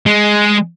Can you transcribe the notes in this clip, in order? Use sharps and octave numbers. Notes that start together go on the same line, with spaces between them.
G#3